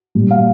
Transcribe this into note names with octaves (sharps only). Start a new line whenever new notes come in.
A#2 G3
F5